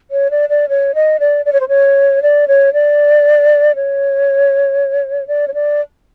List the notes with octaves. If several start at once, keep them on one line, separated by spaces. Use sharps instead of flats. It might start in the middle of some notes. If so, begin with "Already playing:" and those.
C#5
D5
D5
C#5
D#5
D5
D5
C#5
C5
C#5
D5
C#5
D5
C#5
D5
C#5
D5